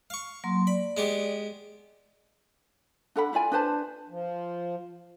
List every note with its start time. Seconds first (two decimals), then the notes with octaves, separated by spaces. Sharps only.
0.10 F5 C#6
0.44 F#3 A#3 C6
0.67 D5 B5
0.97 G#3 B3 G4
3.16 D4 A4 F#5 B5
3.33 E4 F4 D5 G#5
3.52 D4 B4 C5 A5
4.09 F3